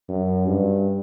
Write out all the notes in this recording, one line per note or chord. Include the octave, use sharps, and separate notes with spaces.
F#2
G2